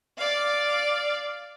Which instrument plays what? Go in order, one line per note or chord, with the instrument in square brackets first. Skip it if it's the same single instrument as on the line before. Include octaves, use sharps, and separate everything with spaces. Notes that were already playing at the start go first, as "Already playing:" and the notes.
[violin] D5 F5